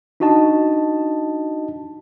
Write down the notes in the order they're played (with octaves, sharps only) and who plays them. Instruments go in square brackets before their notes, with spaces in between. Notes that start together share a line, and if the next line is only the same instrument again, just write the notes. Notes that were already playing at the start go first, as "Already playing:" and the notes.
[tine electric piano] D4 D#4 F#4 D#5 A5